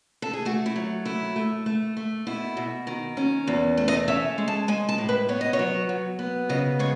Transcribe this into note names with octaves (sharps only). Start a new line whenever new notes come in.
A4
G#4
A3 F#4
E4
F#3
A3 E4
A3
A3
A3
B2 E4
B2
D#3
C#4
E2
A3
D#5
C#4 E5
G#3
A5
G#3 G#5
A5
A2
B4
B3 C#5
D#5
C#5
F#3
F#3
B3
C#3 D#5
G#3 C#5